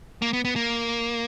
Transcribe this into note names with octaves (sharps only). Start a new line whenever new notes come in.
A#3
B3
B3
A#3